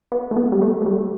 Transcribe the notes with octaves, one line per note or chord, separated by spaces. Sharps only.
B3
A3
B3
G3
A3
A3
G3